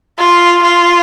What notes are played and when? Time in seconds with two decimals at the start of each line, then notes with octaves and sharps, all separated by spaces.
0.18 F4
0.62 F4